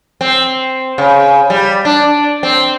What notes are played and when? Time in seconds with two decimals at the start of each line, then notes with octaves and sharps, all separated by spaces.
0.21 C4
0.98 C#3
1.50 G3
1.85 D4
2.43 C4